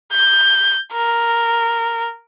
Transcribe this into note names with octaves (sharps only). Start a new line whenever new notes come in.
G6
A#4